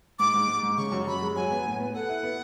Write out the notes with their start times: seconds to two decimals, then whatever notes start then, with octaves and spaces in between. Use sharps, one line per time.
0.19 G#2 D6
0.34 G#2
0.48 G#2
0.63 G#2
0.77 C#3 C#6
0.92 F#2
1.07 F#2 B5
1.22 G#3
1.36 F#3 G#5
1.51 B3
1.66 A2
1.80 B3
1.94 A4 F#5
2.09 E4
2.23 B3